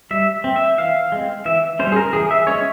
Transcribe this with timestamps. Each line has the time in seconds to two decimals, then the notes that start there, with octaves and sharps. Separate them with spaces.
0.11 G3 E5
0.44 C4
0.56 E5
0.78 E3 F5
1.12 G#3 C4
1.45 E3 E5
1.79 G3 C#4 C5
1.92 G#4
1.96 A#4
2.13 E3 G#4
2.31 E5
2.47 G#3 C#4 C#5